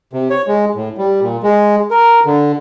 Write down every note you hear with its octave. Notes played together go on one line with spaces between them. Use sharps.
C3
C#5
G#3
A2
G3
A#2
G#3
A#4
D3